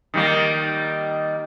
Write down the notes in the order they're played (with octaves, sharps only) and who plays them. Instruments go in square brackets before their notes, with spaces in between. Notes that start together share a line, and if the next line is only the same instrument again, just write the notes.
[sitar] D#3 G3 A#3